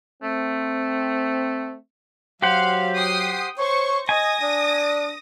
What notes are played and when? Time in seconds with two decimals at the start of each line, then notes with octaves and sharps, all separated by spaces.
0.23 A3 C4
2.42 F#3 G4 C5 F5 F#5
2.95 G5 D#6 C7
3.58 C5 C#5 C6 C#6
4.09 D#5 G#5 D#6 A#6
4.42 D4